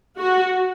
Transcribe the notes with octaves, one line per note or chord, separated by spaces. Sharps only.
F#4